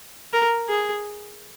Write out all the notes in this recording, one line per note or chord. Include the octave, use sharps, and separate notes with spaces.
A#4
G#4